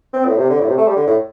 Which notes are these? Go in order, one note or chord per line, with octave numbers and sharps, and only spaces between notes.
C4
A2
C3
D3
A2
C3
A3
G3
D3
A2